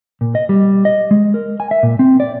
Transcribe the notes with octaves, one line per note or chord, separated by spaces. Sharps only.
A#2
D#5
G3
D#5
G#3
A#4
G#5
E5
A#2
C4
D5